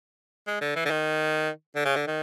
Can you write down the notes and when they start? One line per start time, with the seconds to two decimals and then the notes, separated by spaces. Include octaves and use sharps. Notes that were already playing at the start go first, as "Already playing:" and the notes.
0.47 G#3
0.61 D3
0.76 E3
0.85 D3
0.90 D#3
1.76 D3
1.85 C#3
1.96 D3
2.07 D#3